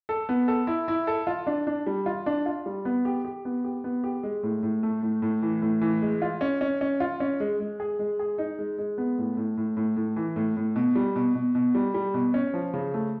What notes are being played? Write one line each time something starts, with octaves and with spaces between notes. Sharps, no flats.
A4
B3
A4
E4
E4
A4
F4
D4
D4
G3
F4
D4
F4
G3
B3
G4
G4
B3
G4
B3
G4
G#3
A2
A2
A3
A2
A2
E3
A2
E3
G#3
F4
C#4
C#4
C#4
F4
C#4
G#3
G#3
G#4
G#3
G#4
D#4
G#3
G#3
B3
A2
A2
A2
A2
A2
E3
A2
A2
B2
G3
B2
B2
B2
G3
G3
B2
C#4
F3
C#3
A3